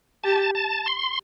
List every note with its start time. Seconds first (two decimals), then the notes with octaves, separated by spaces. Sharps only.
0.24 G4 A5
0.55 A5
0.86 C6